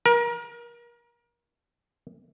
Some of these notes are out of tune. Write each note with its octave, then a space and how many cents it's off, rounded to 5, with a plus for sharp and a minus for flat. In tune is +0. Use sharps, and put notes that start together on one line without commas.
A#4 +30